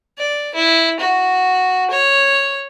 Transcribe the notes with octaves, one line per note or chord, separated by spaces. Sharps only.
D5
E4
F#4
C#5